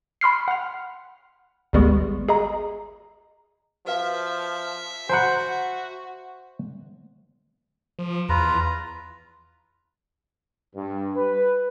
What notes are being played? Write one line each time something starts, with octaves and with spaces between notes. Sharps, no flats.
B5 C6 F6 C7
F#5 F6
G#1 D2 G3 G#3 B3 C#6
G#4 D#5 A#5
F3 F#4 B4 E5 F5
F#4 C5 F#5 G#5 A#5 B5
F3
E2 F4 B4 A#5
G2
B4